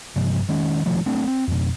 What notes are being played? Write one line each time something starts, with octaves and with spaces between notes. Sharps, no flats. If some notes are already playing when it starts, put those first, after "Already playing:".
G2 C3 F3
D#3 G#3 C#4
B2 D#3 F3 A3
A3 C4 D4
C4
F2 B2